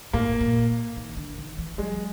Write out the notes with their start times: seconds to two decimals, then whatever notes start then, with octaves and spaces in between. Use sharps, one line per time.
0.13 A2 A#3
0.41 A#2
0.96 D#3
1.17 D3
1.38 D#3
1.58 E3
1.78 F#3 G#3